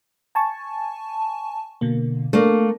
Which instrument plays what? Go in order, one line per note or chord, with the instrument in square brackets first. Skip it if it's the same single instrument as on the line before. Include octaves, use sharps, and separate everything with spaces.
[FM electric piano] G#5 A5 C#6
B2 D3 A#3
[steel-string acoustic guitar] A3 A#3 [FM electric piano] D4